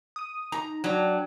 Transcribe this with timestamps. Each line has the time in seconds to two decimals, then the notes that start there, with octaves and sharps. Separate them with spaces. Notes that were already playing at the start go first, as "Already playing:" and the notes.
0.16 D#6 D#7
0.52 D#4 A#5
0.84 F#3 D4 G5